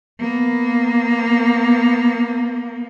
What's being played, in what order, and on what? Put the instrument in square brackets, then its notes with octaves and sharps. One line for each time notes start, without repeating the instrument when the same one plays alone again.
[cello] A#3 B3